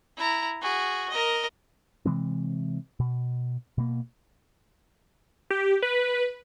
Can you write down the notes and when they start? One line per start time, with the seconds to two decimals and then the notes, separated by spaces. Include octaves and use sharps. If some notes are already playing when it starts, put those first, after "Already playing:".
0.17 E4 A#5
0.62 F#4 G#4
1.10 A#4 D#5
2.05 C3 E3 G#3 C4
3.00 B2
3.78 B2 A#3
5.50 G4
5.82 B4